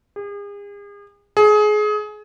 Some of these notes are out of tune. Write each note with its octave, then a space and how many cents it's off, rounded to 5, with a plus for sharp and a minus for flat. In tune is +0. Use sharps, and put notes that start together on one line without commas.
G#4 -40
G#4 +25